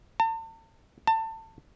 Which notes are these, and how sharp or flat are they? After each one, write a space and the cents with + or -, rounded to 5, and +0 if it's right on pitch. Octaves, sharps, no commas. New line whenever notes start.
A5 +40
A5 +25